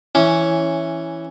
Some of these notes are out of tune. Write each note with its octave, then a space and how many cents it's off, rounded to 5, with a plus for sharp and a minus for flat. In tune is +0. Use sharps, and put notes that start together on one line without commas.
E3 +0 C#4 +0